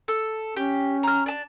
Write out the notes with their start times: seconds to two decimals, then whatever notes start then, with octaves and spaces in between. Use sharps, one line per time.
0.08 A4
0.56 C#4 G4
1.03 A#5 F6
1.26 D4 A5